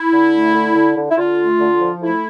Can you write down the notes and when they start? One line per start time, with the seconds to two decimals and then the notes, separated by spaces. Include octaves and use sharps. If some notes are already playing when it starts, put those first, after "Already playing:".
Already playing: E4
0.13 D3
0.34 A3
0.54 D3
0.76 D3
0.97 D3
1.10 E4
1.17 D3 F4
1.39 A3
1.59 D3
1.80 F3
2.01 A3 E4